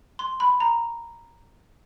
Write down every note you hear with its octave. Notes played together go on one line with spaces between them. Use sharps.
C6
B5
A#5